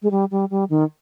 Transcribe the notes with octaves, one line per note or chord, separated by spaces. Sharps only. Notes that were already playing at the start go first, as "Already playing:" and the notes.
G#3
G3
G3
G3
D#3